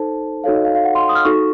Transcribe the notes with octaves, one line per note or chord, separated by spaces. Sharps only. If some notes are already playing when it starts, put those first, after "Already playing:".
Already playing: D#4 A4 C5 A5
D#4 F#4 A4 C#5 F5
D#5
F5
F5
F#5
C6
D#6
F6
D#4 F#4 A4 C#6